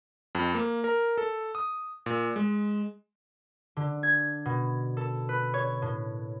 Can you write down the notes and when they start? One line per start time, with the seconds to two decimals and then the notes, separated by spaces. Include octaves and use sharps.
0.35 F2
0.55 A#3
0.84 A#4
1.18 A4
1.55 D#6
2.06 A#2
2.36 G#3
3.77 D3
4.03 G#6
4.45 B2
4.97 A4
5.29 B4
5.54 C#5
5.82 A2